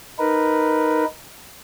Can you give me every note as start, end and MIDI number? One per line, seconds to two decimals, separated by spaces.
0.19 1.05 63
0.19 1.05 70
0.19 1.05 71